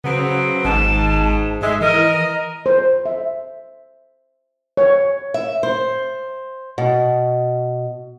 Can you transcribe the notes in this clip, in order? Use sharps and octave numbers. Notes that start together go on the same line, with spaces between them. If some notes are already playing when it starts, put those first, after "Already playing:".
C#3 F#3 B3 C4
G#1 G#2 A5
G#2 G#3 E5
E3 A#4 D#5
C5
E5
C#5
E5
C5
B2